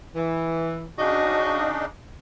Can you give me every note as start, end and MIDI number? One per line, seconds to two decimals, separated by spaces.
0.15 0.86 52
0.99 1.85 49
0.99 1.85 62
0.99 1.85 63
0.99 1.71 66
0.99 1.71 75